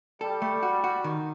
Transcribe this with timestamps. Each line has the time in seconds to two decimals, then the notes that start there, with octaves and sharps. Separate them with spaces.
0.21 G3 A4
0.42 A3
0.63 F#4
0.84 F#4
1.04 D#3